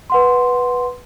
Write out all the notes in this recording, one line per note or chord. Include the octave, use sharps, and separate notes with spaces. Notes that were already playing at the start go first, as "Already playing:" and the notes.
B4 F#5 C6